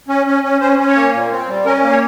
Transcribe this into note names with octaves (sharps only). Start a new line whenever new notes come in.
C#4
C#4
C#4
C#4 C5
C#4
C#5
A#3
A#2
C4
G3
C#4 A#4
A#3
C#5